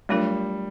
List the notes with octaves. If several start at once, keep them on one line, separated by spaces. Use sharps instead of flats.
F#3 G3 A3 D4 F4 A#4